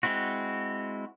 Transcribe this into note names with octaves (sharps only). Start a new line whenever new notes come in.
G#3 C4 E4 F#4